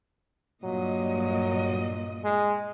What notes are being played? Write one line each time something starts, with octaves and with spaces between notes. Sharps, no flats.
G2 A#2 F#3 D#5
G#3